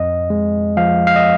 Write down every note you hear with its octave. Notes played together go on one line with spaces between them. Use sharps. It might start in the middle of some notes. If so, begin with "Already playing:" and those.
Already playing: F2 D#5
G#3
F3 F5
F5
D#5